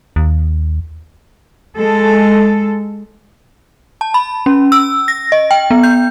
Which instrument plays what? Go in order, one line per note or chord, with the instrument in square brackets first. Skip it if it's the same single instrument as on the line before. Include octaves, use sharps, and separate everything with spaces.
[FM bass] D#2
[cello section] G#3 A4
[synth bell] A5
B5
C#4
E6
A#6
D#5
G5
B3
G6